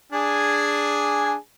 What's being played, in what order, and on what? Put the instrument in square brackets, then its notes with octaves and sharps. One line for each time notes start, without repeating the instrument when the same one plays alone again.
[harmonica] D4 G#4 G#5